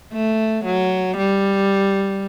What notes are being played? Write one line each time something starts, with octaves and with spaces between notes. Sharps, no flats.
A3
F#3
G3